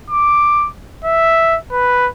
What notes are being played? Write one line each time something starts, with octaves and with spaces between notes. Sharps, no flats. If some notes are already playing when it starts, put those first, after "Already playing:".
D6
E5
B4